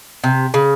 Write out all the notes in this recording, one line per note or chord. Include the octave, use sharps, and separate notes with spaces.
C3
C#3